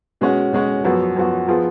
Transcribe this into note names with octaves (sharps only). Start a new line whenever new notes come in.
B2 G#3 C#4 F#4
B2 G#3 C#4 F#4
F#2 F3 B3 F#4
F#2 F3 B3 F#4
F3 B3 F4 G#4